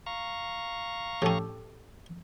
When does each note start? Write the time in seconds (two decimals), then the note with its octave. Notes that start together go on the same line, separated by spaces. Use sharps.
0.06 F5 A#5 C#6
1.22 A2 C#4 G4 A4